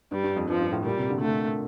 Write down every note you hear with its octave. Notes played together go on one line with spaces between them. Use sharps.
G2 G3
G2
F2
G2 F3
G2
A2
A#2 G3
C3
D3
D3 A3